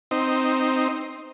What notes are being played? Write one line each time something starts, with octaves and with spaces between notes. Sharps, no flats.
C4 D#4